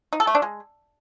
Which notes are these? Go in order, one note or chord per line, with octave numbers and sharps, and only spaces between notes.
D#4
A4
A3
D4
G#3